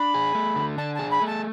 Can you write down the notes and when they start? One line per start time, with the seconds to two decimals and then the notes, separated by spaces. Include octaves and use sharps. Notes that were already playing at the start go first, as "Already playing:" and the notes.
Already playing: D4 B5
0.14 G#4
0.35 A3
0.56 D3
0.78 D4 A5
0.95 G#4 A5
1.11 B5
1.22 A3
1.27 A5